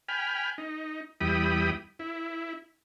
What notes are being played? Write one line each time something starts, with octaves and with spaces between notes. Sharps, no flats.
G5 G#5 B5 F6
D#4
E2 G3 E4 G5 B5 D#6
E4